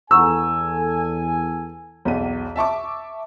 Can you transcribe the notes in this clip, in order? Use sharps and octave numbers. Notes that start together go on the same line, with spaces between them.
E2 A4 F#5 G#5 A#5 C#6 E6
B1 E2 D#7
E5 A5 C#6 D6